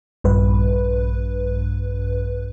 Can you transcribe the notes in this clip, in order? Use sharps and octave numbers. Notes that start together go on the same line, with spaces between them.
A#1 G2 B4